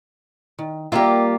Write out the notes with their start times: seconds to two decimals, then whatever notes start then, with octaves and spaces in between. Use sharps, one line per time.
0.59 D#3
0.92 G3 A#3 F4 G4 E5